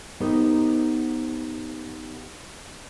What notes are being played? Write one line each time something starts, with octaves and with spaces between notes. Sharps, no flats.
B3 D#4 G4 A#4 C5